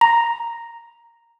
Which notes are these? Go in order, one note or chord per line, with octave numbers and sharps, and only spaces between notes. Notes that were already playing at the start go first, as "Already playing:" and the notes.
A#5